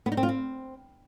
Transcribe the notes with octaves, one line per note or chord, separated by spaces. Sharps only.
B3
D#4
C4
F4
C4